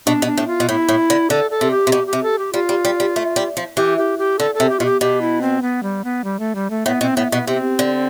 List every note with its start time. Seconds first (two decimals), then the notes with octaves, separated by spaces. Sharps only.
0.06 B2 D4
0.22 B2
0.27 D4
0.37 A2
0.48 F4
0.60 B2
0.69 A2 E4
0.89 A2
1.10 D3
1.30 D3 A4
1.51 A4
1.61 C3
1.71 G4
1.87 C3
1.92 B2 G4
2.07 G4
2.13 C3
2.23 A4
2.38 G4
2.53 G3 F4
2.69 G3
2.85 G3
3.00 G3
3.16 A3
3.36 G3
3.57 F3
3.77 E3 G4
3.98 G4
4.19 G4
4.39 D3 A4
4.55 A4
4.60 C3
4.69 G4
4.80 B2 F4
4.85 G4
5.01 B2 G4
5.21 E4
5.41 C4
5.62 B3
5.83 G3
6.04 B3
6.24 G3
6.39 A3
6.55 G3
6.70 A3
6.86 A2 B3
7.01 B2 C4
7.17 A2 B3
7.32 B2 B3
7.47 C3 C4
7.79 D3